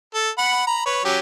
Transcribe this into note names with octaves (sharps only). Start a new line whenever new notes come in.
A4
F#5 B5
A#5 B5
B4 C#5
F#3 C#4 G4